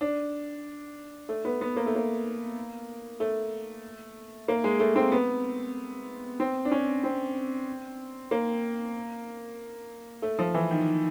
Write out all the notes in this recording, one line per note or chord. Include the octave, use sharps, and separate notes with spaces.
D4
A3
B3
B3
A#3
A3
A#3
A3
A#3
G#3
A3
C4
B3
C4
D4
C#4
C4
A#3
A3
F3
E3
D#3